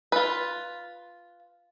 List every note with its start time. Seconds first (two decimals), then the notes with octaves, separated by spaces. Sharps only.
0.12 F4 B4